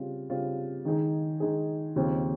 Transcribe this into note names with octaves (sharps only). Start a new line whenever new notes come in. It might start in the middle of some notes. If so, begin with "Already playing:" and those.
Already playing: C#3 G3 C4 F4
C#3 G3 C4 F4
D#3 G#3 D#4 G#4
D#3 G#3 D#4 G#4
D#2 C#3 F3 C4